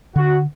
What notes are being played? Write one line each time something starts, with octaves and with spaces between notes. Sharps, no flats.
D3 F#4